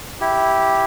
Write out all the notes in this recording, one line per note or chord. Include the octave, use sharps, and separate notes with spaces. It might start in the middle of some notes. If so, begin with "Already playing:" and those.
E4 G4